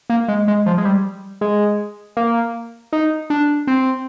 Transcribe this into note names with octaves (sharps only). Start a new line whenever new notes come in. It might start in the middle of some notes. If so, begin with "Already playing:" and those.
A#3
G#3
G#3
F3
G#3
G3
G#3
A#3
D#4
D4
C4